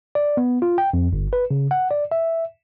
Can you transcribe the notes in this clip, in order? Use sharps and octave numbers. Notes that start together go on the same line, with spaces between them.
D5
B3
F4
G5
F2
G1
B4
C#3
F#5
D5
E5